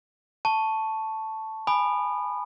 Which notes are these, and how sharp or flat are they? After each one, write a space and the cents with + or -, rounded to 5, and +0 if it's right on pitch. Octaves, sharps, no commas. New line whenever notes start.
A5 +0 C#6 +0
G#5 -5 B5 +0 D#6 -40